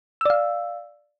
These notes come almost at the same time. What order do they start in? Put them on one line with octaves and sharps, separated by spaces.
E6 D5 F5